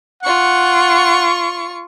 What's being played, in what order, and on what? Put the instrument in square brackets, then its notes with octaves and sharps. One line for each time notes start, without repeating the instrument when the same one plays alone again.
[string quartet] F4 C#6 [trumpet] F#5